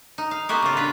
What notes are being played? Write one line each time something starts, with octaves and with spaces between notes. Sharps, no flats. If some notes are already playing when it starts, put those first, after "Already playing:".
D#4
F5
A#3 B3 F#4 G4
C#3 F4
D4 B4